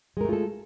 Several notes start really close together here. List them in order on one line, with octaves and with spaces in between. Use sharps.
G#3 A#4 A3 F4 A4